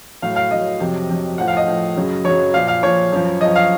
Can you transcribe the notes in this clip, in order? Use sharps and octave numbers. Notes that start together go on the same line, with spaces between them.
A2 F#3 F5
F5
A2 F#3 D#5
F2 C3 F#3
F2 C3 F#3
A2 F3 F#5
F5
D#5
A2 F3
F#2 C#3 F#3
F#2 C#3 F#3 C#5
A#2 F3 F5
F5
A#2 F3 C#5
F#2 F3
F#2 F3 D#5
F5